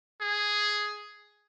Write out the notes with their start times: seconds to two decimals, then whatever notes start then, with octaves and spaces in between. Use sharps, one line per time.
0.22 G#4